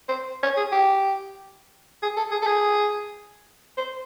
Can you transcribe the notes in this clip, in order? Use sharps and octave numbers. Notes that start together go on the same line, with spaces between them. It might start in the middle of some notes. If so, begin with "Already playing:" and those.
C5
C#5
G#4
G4
G#4
A4
G#4
A4
G#4
C5